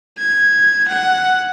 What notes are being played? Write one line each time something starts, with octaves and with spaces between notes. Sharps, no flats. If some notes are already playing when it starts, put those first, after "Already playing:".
G#6
F#5